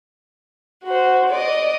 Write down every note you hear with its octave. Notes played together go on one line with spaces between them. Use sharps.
F#4 C5
D5 D#5